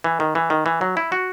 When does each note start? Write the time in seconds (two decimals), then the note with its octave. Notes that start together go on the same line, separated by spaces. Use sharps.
0.04 E3
0.20 D#3
0.35 E3
0.50 D#3
0.66 E3
0.81 F#3
0.97 E4
1.12 F#4